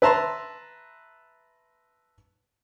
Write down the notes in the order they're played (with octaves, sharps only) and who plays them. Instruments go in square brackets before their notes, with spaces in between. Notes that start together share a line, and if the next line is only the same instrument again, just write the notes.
[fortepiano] B4 E5 A5 A#5 C6